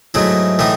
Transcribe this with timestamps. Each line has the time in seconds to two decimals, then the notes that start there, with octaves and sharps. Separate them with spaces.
0.14 G#2 F#3 A3 E4
0.59 A2 E3 A3 D#4